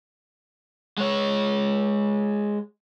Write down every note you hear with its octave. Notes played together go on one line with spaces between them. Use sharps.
G#3 C#5